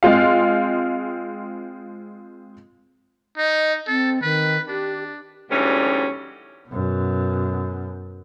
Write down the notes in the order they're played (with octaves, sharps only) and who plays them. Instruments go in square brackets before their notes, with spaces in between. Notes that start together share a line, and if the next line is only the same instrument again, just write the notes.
[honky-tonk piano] G#3 C4 F4 F5
[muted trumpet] D#4 [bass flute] D#5
[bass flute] C4 [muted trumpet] A4
[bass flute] D#3 [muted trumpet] B4
[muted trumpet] D4 [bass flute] G4
[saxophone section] D2 G#2 B2 E3 G3 C#4
[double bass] F#2 B2